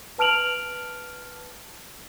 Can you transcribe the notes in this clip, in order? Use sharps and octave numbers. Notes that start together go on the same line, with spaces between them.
B4 A5 F6 D7 F7 F#7